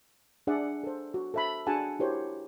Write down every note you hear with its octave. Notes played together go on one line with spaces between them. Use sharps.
D4 G#4 D5 E5 F#5
A4 C5
F#4
A4 C5 E5 A5 B5
D4 F#4 G#4 F#5 G#5 A5
E4 F#4 G4 A#4 C5 C#5